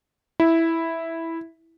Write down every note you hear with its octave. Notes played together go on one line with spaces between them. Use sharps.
E4